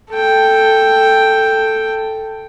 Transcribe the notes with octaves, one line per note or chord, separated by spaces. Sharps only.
A4 G5